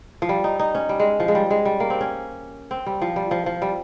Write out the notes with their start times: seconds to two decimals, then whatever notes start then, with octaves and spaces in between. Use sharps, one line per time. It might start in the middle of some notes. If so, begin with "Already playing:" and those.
0.22 F3
0.29 G3
0.44 D#4
0.59 D#4
0.75 C#4
0.89 G3
1.00 G#3
1.20 F3
1.28 G#3
1.35 G3
1.50 G#3
1.65 G3
1.80 A#3
1.90 C4
2.01 C#4
2.71 C4
2.86 G3
3.02 F3
3.16 G3
3.31 F3
3.46 F3
3.62 G3